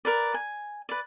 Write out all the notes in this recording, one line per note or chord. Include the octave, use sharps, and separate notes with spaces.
A#4 B4 D5
G#5
B4 D5